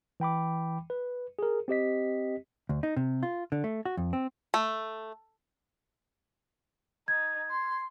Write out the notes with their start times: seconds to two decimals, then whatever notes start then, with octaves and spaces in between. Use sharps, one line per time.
0.20 E3 G5 B5 D6
0.90 B4
1.39 G#4 A#4
1.68 C4 G4 D#5 B6
2.69 D2
2.83 D#4
2.96 C3
3.23 F4
3.52 D3
3.64 A3
3.85 F#4
3.97 F2
4.13 C4
4.54 A3
7.08 D#4 G#6
7.50 C6